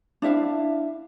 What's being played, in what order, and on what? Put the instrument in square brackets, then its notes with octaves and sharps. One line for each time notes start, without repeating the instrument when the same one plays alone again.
[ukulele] D4 E4 E5 F5